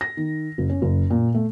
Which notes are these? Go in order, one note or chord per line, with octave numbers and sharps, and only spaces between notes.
A#6
D#3
F#1
C#4
F#1
A#2
A3